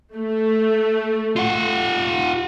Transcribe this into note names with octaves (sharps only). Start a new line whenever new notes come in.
A3
F4 F#5